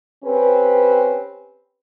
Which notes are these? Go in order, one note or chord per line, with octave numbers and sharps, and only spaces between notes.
C4 C#4 G4 B4